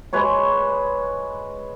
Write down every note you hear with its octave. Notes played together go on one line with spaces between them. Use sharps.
G#3 B4 C#5 C#6